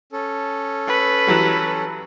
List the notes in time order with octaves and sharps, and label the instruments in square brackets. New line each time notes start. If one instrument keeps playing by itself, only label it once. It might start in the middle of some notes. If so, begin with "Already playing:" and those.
[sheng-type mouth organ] C#4 A4
[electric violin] B4
[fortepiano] E3 F#3 G3